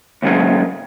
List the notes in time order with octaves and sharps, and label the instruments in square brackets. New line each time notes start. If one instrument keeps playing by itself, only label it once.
[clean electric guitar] D#2 G#2 C#3 F#3 A#3